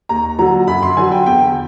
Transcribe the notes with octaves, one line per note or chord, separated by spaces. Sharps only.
D#2 A#5
D3 F#3 A#5
F#2 B5
C6
D3 F#3 G#5
G5
E2 G5